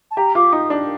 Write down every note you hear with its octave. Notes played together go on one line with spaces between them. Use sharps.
A5
G4 A#5
F4 D6
D#4 D#6
D4